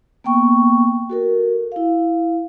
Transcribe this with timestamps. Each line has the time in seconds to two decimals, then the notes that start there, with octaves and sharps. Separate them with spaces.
0.24 A#3 B3 G5 C#6
1.10 F#4 A4 A#4
1.72 E4 F5